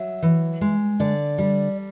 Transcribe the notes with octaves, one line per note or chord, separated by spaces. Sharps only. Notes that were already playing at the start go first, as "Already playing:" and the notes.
Already playing: F#3 E5
E3
G#3
D3 D5
G3